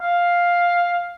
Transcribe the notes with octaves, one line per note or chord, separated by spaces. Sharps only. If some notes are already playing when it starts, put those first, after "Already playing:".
F5